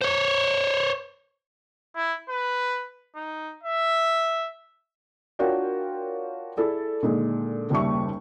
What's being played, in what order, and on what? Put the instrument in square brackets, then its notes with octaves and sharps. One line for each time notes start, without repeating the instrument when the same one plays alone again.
[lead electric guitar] C5 C#5
[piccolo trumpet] E4
B4
D#4
E5
[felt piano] D4 F4 F#4 A#4 C#5 G5
E4 G#4 A4 D5
A#2 D3 D#3 G#3
F#1 D#2 G3 E5 C#6